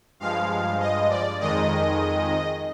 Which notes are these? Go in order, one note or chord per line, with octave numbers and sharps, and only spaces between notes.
G2 F3 G#3 F5
D#5
D5
F2 D#3 G#3 D#5